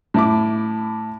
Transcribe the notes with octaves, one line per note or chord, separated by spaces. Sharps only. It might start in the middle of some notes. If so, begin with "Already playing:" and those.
A2 E4 D6